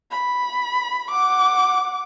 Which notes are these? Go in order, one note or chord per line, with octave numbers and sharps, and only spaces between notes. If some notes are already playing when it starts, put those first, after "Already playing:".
B5
F#5 D6